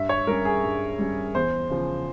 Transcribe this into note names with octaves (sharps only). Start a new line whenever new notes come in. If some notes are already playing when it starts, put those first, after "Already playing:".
Already playing: G2 E5
C#5
G3 C#4 A#4
G#4
G2
G3 C#4
E2 C5
C#3 F3